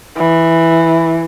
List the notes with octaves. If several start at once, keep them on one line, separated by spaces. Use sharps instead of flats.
E3